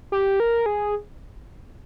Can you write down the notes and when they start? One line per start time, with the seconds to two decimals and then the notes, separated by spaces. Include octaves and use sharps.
0.12 G4
0.40 A#4
0.66 G#4